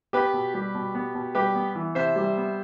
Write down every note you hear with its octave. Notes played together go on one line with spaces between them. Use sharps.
B3 G4 B4
B2
G3
B2
B3
B2
G3 G4 B4
B3
E3
C3 C5 E5
G3
B3